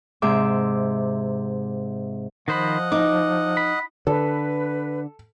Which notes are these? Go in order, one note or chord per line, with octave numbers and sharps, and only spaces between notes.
G#2 C3 E5 D6
D#3 F3 C5 D#5 F#5 B5
D#4 D6
B5
D3 A4 B4